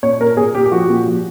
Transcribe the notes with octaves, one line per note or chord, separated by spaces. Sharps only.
A#2 C#5
A#2 A#4
A#2 G#4
A#2 G4
G4
F3 F#4
A#2
F3